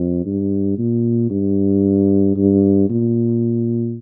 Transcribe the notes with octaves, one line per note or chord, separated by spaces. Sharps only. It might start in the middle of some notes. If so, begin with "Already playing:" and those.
Already playing: F2
G2
A#2
G2
G2
A#2